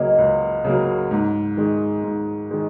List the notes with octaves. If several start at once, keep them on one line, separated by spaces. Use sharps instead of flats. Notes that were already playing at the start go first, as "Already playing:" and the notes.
Already playing: C#2 C#3 F#3 A#3 D#5
C#2
C#3 F#3 A#3
G#2
D#3 G#3
G#2
D#3 G#3